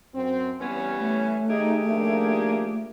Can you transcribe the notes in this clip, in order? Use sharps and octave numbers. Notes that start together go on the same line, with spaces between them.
F#2 C4
E3 G3 B3 C#4
A3
D#2 D#4 G4 G#4
F3 A#3 D4